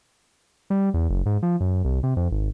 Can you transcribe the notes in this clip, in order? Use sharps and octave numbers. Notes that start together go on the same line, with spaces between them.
G3
E2
F#1
G#2
F3
F#2
C2
C3
F2
G#1